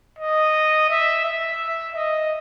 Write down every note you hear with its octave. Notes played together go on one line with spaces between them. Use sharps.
D#5
E5
E5
D#5